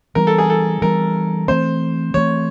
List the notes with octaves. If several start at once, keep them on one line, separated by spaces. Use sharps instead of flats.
E3 G3 B3 D4 A#4
A4
G#4
A4
E3 G3 B3 D4 A#4
E3 A3 C4 C5
E3 A3 C4 C#5